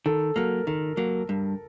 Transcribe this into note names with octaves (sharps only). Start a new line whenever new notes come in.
D#3 A4
F#3 A#3 A#4
D#3 A#4
F#3 A#3
G2